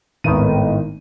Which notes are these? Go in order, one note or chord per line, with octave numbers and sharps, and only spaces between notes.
G#1 A2 D#3 B3 D#7